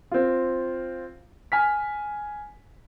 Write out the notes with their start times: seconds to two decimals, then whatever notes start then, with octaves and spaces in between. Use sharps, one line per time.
0.11 C4 F4
1.52 G#5 F6 B6